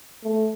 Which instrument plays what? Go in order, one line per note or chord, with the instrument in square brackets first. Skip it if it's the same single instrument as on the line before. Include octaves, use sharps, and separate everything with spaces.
[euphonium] A3